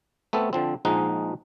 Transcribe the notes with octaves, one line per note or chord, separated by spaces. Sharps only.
A3 B3 C4 A4
D3 F3 C4
A#1 F3 G#3 D#4 F#5